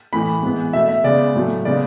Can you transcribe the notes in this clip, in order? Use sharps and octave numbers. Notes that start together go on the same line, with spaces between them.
A2 E3 A3 B5
G#2 E3 B3
B2 A3 E5
E5
C#3 G#3 B3 D5
A2 F#3 A3
C#3 G#3 B3 D5